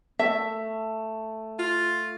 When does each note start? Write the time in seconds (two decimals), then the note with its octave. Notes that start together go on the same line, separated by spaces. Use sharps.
0.19 A3 E5
1.59 F4